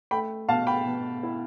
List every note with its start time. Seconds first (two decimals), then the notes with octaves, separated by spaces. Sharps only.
0.11 A3 G5 B5
0.49 B2 F5 A5
0.67 G5 B5
0.86 B2
1.23 E4